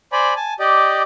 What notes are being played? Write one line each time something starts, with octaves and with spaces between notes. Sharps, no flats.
C5 D5 G#5 B5
G#5 A5
G4 D5 D#5